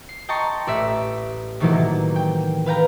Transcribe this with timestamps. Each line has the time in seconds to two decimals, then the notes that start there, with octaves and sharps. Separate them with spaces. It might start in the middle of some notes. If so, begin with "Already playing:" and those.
0.09 C7
0.29 D#5 G5 A5 A#5 C6 C#6
0.67 A1 D5 E5 B6
1.60 A2 C3 D#3 E3 F#3 A#3
2.16 G5
2.66 B4 F5 G5 A#5